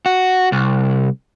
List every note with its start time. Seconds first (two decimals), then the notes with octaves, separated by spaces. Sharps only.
0.06 F#4
0.52 C2